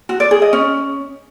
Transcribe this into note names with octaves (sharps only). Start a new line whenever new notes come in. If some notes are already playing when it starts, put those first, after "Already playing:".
F#4
D5
G#4
D#5
C#4